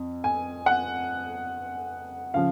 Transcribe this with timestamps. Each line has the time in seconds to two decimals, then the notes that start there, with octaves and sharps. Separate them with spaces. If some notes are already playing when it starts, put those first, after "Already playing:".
Already playing: F2
0.24 G#5
0.66 F#5
2.34 C#3 F3 F5